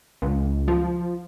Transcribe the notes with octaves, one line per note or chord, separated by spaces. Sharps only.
C#2
F3